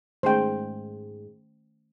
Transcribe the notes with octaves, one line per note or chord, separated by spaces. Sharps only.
G#2 D#3 G#3 A3 C#4 C5 G5